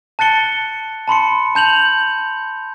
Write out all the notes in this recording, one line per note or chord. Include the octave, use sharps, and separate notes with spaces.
A5 F#6 A6 C#7 G7
A5 B5 C6 C#7
A5 G6 F7 F#7